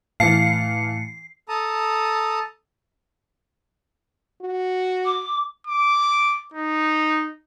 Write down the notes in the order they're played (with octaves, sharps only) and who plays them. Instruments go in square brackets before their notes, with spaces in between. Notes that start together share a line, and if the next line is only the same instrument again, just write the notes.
[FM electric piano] A2 A5 C#7 [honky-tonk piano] E3 F5 [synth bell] C7
[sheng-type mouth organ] A4 A5 A#5 D#6
[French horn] F#4
[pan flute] D6
[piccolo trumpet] D6
D#4